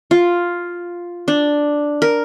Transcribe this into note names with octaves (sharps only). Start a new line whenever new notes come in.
F4
D4
A#4